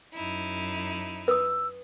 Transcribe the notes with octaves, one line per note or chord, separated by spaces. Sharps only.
F#2 D#4 E4
B4 D#6 E6